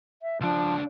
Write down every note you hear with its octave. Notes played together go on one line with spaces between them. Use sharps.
E5
C#2 F3 D4